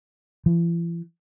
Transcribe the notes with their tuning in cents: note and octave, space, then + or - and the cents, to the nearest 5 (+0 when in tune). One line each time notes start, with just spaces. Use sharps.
E3 +45